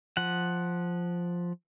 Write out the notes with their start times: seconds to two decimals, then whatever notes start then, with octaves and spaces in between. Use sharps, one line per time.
0.17 F3 F#5